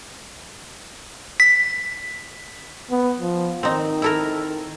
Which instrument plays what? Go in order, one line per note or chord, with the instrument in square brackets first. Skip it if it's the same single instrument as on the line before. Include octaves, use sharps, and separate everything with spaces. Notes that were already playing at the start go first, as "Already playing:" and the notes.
[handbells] B6
[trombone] B3
F3
[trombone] D#3 [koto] C4 D#4
[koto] E4 A4 A#4